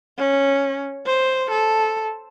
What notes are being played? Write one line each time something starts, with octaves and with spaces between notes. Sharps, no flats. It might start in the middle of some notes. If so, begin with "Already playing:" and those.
C#4
C5
A4